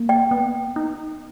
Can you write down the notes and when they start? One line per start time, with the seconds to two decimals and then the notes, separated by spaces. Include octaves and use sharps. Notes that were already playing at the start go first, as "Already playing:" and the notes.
Already playing: A#3
0.09 G5
0.31 B3
0.76 D#4